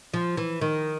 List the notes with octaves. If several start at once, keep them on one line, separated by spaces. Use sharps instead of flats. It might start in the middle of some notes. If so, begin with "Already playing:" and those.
F3
E3
D#3